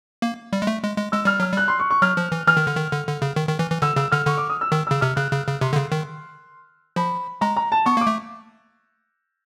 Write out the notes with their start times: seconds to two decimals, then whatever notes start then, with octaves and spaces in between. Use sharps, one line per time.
0.22 A#3
0.53 G3
0.62 G#3
0.67 A3
0.83 G#3
0.98 G#3
1.12 G#3 E6
1.25 G3 F6
1.40 F#3 F6
1.52 G3 F#6
1.68 C6
1.79 C#6
1.90 C#6
2.02 F#3 F6
2.17 F3
2.32 E3
2.47 E3 F6
2.57 D#3
2.67 D3
2.77 D#3
2.92 D3
3.07 D3
3.22 C#3
3.36 D#3
3.49 D#3
3.59 E3
3.71 E3
3.82 D3 E6
3.96 C#3 E6
4.12 D3 F6
4.27 D3 C#6
4.38 D6
4.50 D#6
4.61 E6
4.72 D#3 E6
4.87 C#3 E6
5.01 C3 F6
5.16 C#3 F#6
5.32 C#3
5.47 C#3
5.61 C3 C6
5.73 D3
5.76 C#3
5.92 D#3
6.96 F3 B5
7.41 G#3 A#5
7.56 A#5
7.72 A5
7.86 B3 C#6
7.97 A#3 D6
8.07 A3